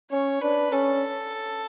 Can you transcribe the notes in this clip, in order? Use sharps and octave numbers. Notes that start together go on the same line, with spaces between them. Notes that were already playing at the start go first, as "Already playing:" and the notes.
C#4 C#5
D4 B4
C#4 A4